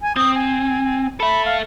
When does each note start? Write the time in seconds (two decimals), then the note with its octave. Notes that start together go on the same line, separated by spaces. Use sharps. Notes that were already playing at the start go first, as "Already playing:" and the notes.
0.02 G#5
0.16 C4 D#6
0.35 G#5
1.20 A4 E5 B5
1.45 F5